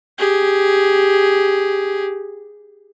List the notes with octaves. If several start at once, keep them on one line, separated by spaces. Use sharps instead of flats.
G4 G#4